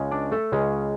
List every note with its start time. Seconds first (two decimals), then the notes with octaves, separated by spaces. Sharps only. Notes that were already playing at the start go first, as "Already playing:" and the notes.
Already playing: C#2 C#3 G#3 C#4
0.11 D4 D5
0.32 A3 A4
0.52 C#2 C#3 G#3 C#4